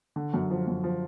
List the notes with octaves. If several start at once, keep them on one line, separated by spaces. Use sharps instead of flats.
D3
F#2
F3
F#2
F3